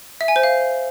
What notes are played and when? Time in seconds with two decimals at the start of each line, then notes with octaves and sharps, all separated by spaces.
0.21 E5
0.28 G#5
0.36 C5
0.43 F5